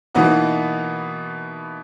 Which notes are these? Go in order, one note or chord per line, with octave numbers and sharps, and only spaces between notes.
B2 E3 A#3 B3 D#4 F#4